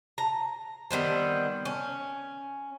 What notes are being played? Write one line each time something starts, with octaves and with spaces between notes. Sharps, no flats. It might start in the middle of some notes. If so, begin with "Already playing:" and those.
A#5
D#3 G3 B3 C4
C#4